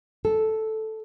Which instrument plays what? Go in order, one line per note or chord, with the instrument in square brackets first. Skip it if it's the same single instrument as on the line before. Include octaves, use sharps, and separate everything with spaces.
[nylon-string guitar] A4